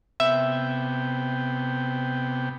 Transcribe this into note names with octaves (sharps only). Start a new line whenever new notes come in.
C3 B3 E5 G5